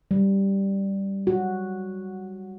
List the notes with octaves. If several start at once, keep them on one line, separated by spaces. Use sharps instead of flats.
G3
F#4